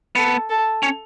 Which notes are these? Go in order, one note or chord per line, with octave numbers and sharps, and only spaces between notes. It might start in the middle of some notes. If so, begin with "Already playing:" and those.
B3 A4
A4
C#4